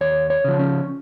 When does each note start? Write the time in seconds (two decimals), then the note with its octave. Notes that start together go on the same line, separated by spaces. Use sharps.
0.01 D#2 C#5
0.30 C#5
0.44 C#3 F3
0.59 C#4